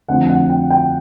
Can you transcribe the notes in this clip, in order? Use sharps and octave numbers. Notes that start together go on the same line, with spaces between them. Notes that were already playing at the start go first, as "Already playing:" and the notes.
F2 D3 F3 A3 C4 F#5
F#5
G5
G5